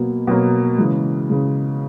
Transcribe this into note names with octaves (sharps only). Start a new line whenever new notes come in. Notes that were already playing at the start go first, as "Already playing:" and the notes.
Already playing: B2 F#3 A#3
B2 F#3 A#3
C#3 E3 G#3
C#3 E3 G#3